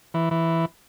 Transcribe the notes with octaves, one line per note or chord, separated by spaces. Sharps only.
E3
E3